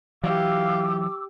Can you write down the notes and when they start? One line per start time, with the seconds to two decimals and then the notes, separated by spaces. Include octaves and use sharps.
0.24 E3 F#3 G4 F5 D6 E6